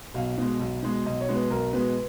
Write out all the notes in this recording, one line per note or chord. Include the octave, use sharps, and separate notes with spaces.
B1 F5
B2 G#3
B1
B2 G#3
B1 D#5
C#5
B2 G#3
B4
B1 A#4
B2 G#3 B4